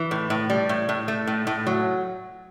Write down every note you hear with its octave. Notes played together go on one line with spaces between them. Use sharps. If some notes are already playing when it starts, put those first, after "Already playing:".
Already playing: E3
A2
A2
G3
A2
A2
A3
A2
A2
F#3